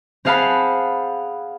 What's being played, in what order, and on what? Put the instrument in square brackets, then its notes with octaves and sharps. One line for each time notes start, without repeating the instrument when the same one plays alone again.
[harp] C4 G#4 F5 F#5 A5 B5